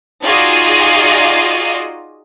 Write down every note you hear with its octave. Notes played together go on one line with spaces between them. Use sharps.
D#4 F4 F#4 G#4 D5 D#5